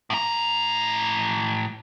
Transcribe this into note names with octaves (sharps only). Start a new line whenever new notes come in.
A2 A#5